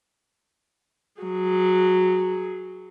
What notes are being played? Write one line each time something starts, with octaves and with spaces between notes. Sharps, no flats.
F#3 G#4